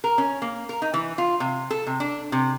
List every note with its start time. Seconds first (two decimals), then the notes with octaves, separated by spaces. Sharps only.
0.04 A#4
0.18 C#4
0.42 A#3
0.69 A#4
0.82 D#4
0.94 E3
1.18 F4
1.40 C3
1.71 A4
1.87 C3
2.00 D4
2.32 C3